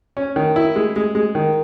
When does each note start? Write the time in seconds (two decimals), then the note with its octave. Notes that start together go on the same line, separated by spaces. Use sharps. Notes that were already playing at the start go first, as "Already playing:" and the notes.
0.17 C#4
0.36 D#3
0.56 E4
0.76 G#3
0.96 G#3
1.15 G#3
1.35 D#3